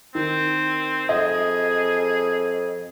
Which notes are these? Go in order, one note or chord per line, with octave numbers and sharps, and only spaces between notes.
D#3 C4
F2 G#4 D#5